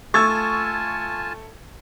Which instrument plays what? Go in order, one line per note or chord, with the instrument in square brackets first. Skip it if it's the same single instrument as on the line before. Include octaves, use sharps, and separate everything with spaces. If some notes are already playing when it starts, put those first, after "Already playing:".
[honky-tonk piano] A3 [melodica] F4 G#5 A5 [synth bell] C#6 [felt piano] E6 G#6 A6